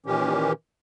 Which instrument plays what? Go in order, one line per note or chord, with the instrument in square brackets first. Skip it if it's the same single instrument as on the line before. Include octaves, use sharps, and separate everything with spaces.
[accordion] A#2 D#3 E3 C#4 G4